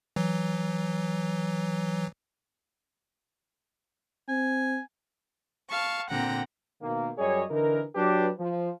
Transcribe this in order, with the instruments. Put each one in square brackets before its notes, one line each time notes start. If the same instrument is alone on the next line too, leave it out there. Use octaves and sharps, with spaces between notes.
[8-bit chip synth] E3 F#3
[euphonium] C4 [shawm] G#5
[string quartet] F5 A5 C#6
A#2 D3 C4 F#5 G5 A#5
[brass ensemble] B2 D#3 A#3
F#2 G3 G#4 C#5 D#5
D3 E3 D#4 A#4
F#3 D4 G4 B4
F3